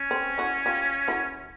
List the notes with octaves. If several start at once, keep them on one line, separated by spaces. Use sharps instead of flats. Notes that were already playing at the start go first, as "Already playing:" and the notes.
Already playing: C#4
C4
E4 F#4
F4 G4
E4 F#4